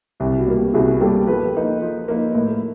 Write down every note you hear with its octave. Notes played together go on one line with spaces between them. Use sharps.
C2 G4
F#4
B2 G3 A#3
G4
C2 F#4 G#4
B2 G3 A#3 G4 A4
F3 A4 B4
A#3 D#4
F3
A#3 D#4
A2 A#4
A4